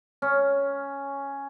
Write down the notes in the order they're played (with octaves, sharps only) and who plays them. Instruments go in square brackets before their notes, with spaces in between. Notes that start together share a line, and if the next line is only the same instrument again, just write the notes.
[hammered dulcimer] C#4